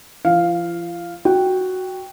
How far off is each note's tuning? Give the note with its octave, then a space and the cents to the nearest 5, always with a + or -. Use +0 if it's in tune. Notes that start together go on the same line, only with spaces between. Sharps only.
F3 -40 F5 +0
F#4 +0 G5 +0